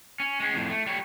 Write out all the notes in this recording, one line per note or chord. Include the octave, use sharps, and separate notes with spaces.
C#4
G#3 C#4
F2 A2
A3
G3 C#5